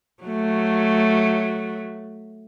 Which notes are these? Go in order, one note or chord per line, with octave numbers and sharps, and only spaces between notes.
F#3 A3